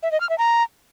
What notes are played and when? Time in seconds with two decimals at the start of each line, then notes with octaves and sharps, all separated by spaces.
0.03 E5
0.12 D#5
0.21 F6
0.29 E5
0.38 A#5